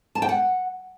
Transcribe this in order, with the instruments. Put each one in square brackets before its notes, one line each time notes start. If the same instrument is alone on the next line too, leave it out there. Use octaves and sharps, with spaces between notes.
[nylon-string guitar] A5
G5
F#5